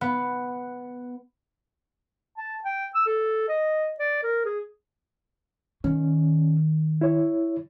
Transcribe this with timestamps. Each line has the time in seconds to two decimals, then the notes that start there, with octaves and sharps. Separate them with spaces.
0.01 B3
2.37 A5
2.64 G5
2.95 E6
3.06 A4
3.48 D#5
3.99 D5
4.23 A#4
4.45 G#4
5.84 D#3 C#4
7.01 E4 C#5